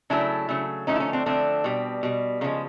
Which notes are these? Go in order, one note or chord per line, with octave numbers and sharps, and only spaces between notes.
C#3 F#3 A3 D4 E4
C#3 F#3 A3
D3 F3 A3 C#4 D#4
E4
C#4 D#4
C4 D4
D3 F3 A3 C4 D4
B2 G3
B2 G3
C#3 F3 G#3 A#3